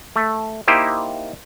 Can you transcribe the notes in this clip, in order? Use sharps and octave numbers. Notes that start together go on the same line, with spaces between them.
A3
A#3 D#4 E4 G4 C5